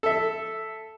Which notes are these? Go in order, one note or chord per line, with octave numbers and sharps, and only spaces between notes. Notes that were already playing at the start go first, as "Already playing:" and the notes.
A4 E5